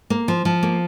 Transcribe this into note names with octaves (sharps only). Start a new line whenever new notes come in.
A#3
F3
F3
A#3